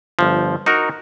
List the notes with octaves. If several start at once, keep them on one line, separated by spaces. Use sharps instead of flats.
G1 F3
D#4 F#4 A#4